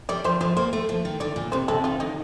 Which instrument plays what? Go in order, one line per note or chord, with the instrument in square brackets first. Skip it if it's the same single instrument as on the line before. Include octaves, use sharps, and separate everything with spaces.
[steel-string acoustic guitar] G3 [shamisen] D5
[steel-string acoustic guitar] F3 [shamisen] C5
[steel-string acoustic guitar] F3 [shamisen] C5
[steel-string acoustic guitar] A#3 [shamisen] C5
[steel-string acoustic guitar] A3
F3
D#3
[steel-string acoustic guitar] D3 [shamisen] D5
[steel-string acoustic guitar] A#2
[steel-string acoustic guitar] C3 [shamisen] C5
[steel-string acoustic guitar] C3 [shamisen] A4
[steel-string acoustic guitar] D#3 [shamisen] F4
[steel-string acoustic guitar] D3 [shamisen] D#4